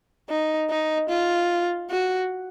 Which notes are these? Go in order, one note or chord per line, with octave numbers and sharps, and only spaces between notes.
D#4
D#4
F4
F#4